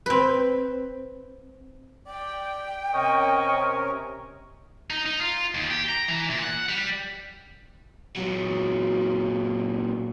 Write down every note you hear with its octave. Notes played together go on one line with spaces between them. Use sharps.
C4 B4
D5 G5
C3 C#4 A#4 D#5 C#6
D#4
D#4
F4
D#2
G4
A#5
E3
A#2
F#5
G3
A#2 F#3